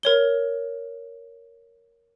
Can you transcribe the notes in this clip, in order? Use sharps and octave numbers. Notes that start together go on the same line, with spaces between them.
A#4 C#5 G7